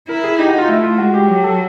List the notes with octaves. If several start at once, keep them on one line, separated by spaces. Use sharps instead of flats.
E4 A#4
G#4
D#4 G4
F#4
F4
A3 E4
F4
G#3 F#4
G4
F#3 G4
A4